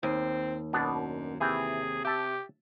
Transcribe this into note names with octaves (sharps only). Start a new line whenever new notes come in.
D#2 C4
F#2 B2 B3 D4
C3 E3 G#4 G5
G4 E5 A5